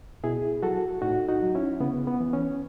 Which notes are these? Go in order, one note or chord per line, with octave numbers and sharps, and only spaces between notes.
B2 E4 G#4
F#3 F#4 A4
A2 D#4 F#4
D#4 F#4
F#3
C#4 E4
C#3 B3
B3
E3
C#4